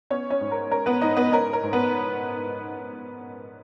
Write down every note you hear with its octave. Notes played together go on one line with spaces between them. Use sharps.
B3 C#4 C#5
C#4 C#5
G#2
A#4
C#4 A#4
B3 B4
G#2 D#4 D#5
B3 B4
C#4 A#4
A#4
G#2
B3 B4